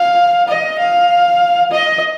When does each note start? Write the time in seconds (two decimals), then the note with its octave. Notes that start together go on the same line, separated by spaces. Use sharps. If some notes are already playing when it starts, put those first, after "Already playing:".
Already playing: F5
0.48 D#5
0.79 F5
1.72 D#5